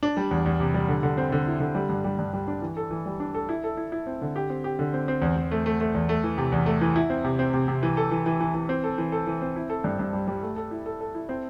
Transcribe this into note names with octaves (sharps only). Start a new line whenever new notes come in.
D4
G3
E2
E2
C3
G3
D3
D3
C4
D3
E4
D3
G3
G2
G3
G2
G3
D4
E3
A4
E3
G3
D4
A4
E4
A4
E4
E4
C4
D3
G4
C4
G4
D3
C4
C4
E2
E2
A3
A3
A3
E2
A3
E3
C3
E2
A3
E3
E4
C4
C3
C4
C3
C3
E3
A4
E3
E3
E3
E3
C4
A4
E3
A4
E3
C4
E4
A4
G2
G2
G3
G3
A3
A4
E4
A4
A4
E4
C4